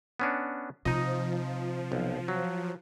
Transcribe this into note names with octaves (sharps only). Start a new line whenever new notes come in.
B3 C#4 D4
C3 F3 D#4 D#5
B1
F#3